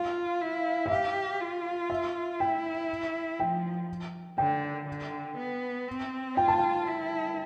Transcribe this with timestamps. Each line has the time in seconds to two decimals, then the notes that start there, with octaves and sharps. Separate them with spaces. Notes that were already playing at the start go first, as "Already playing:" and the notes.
Already playing: F4 F5
0.41 E4
0.86 E5
0.91 G4 F5
1.40 F4
1.90 E5
2.40 E4 G5
3.39 F3 G5
4.38 D3 G5
4.88 D3
5.37 B3
5.88 C4
6.37 F4 G5
6.48 A5
6.58 G5
6.87 E4